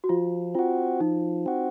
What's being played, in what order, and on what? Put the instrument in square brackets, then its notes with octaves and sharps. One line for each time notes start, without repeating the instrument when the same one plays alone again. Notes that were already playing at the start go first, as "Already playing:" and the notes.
[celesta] F#4
[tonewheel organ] F3 [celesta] F4
[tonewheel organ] C4 F#4 [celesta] F4
[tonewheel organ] F3 [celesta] D#4
[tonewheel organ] C4 F#4